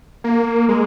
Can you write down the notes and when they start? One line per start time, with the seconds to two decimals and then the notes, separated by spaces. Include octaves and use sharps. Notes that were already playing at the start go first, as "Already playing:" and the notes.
0.24 A#3
0.69 G#3